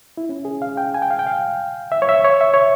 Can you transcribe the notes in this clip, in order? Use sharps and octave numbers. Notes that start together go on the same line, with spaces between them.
E4
C#4
G#4
F5
G5
G#5
G5
F5
G5
F5
E5
C#5
E5
C#5
E5
C#5